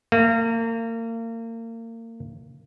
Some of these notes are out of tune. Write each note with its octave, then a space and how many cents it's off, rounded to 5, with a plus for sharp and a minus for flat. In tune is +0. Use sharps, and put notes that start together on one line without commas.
A#3 -35